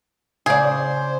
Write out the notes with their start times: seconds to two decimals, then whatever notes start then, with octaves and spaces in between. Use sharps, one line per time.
0.46 C#3 G#4 C5 D5